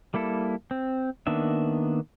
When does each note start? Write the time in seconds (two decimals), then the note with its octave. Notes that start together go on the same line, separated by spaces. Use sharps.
0.14 G3 A#3 E4 A4
0.71 C4
1.27 D#3 A#3 B3 D4 E5